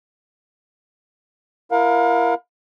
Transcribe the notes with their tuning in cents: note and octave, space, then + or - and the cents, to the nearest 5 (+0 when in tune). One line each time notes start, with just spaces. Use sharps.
E4 +30 A#4 +10 F5 +35